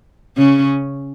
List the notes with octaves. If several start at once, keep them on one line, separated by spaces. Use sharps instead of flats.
C#3 C#4